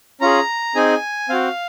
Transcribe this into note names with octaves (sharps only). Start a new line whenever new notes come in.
C#4 F4 G#4 A#5
C4 D#4 G#4 G#5
C4 F#4 F5